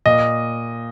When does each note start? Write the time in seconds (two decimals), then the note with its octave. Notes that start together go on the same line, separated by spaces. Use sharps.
0.06 A#2 D#5